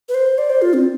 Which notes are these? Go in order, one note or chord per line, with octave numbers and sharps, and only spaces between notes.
B4
C5
D5
C5
F4
C4